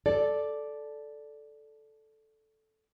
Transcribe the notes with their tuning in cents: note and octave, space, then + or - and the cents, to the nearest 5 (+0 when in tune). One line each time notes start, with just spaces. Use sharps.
A4 -5 D5 +0